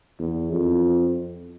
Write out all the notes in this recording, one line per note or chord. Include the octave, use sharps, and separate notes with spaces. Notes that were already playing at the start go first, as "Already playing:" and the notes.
E2
F2